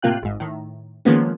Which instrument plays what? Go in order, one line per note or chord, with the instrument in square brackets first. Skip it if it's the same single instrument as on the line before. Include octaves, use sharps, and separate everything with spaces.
[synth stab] A2 C3 A#3 F4 G5 F#6
G#1 G#2
A2 D#3
D#3 F3 G#3 A#3 B3 C#4